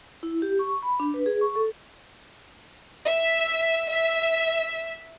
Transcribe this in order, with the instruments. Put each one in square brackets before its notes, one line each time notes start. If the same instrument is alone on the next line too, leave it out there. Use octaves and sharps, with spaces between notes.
[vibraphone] E4
G4
C#6
B5
D4
B4
G#4
C#6
A4
[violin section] E5
E5